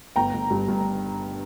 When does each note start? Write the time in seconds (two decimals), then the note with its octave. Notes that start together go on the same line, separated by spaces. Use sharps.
0.16 G1 G5 A#5
0.33 G1
0.50 G2
0.68 G2